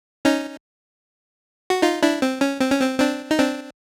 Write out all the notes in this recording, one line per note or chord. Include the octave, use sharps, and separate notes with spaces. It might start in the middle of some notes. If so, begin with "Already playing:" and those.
C#4 D#4
F#4
D#4 F4
D4 E4
C4
C#4
C4
C#4
C4
C4 D4
D#4
C4 D4